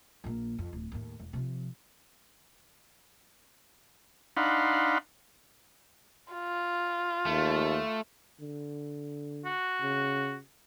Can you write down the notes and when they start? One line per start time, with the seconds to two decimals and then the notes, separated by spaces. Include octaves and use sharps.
0.24 A#1 A#3
0.58 F2
0.73 D1
0.92 D#2 A2
1.20 E1
1.33 C3 F3
4.37 D4 D#4 F5 F#5 B5 C6
6.33 F4
7.26 D#2 A3
8.40 D3
9.45 F#4
9.81 C#3